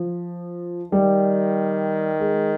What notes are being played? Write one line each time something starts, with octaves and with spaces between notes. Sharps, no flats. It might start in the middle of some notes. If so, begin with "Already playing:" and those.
Already playing: F3
D#3 G3
G#3